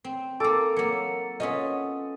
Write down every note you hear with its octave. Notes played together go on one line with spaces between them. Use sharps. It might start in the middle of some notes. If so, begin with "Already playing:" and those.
C4
A#3 D#4 A4 D6
F#3 A#3 C#7
B3 C#4 F4 D#5